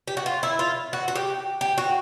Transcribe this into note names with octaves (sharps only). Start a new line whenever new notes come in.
G4
F#4
F4
E4
F4
F#4
F#4
G4
G4
F#4